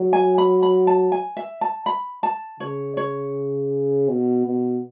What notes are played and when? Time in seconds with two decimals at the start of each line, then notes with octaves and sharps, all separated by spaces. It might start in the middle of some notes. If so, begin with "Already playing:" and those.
Already playing: F#3
0.13 G#5
0.38 B5
0.62 B5
0.87 A5
1.12 G#5
1.37 E5
1.61 A5
1.86 B5
2.23 A5
2.60 C#3 C#5
2.97 C#5
4.08 B2
4.45 B2